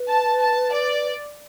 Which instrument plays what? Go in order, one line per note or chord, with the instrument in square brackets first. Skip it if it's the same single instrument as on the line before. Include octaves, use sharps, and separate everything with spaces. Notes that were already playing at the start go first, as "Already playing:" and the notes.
Already playing: [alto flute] B4
[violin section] A5
A5
D5